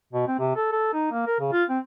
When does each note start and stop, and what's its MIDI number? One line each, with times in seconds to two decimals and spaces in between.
0.13 0.26 47
0.27 0.35 60
0.39 0.53 48
0.56 0.68 69
0.72 0.89 69
0.94 1.11 63
1.11 1.22 58
1.27 1.38 70
1.40 1.51 49
1.52 1.64 65
1.69 1.78 60